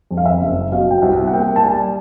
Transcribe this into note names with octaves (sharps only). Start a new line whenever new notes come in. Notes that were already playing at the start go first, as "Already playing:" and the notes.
F2
F5
E5
F#1
B2 F5
G5
C2 F#5
F#5
A#3 G5
A5
G3 G#5